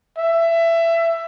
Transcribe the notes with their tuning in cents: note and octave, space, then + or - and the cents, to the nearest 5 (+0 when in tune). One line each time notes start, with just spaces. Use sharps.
E5 +20